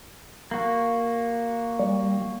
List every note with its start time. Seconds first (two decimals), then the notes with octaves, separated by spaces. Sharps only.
0.51 A#3 F#4
1.79 G3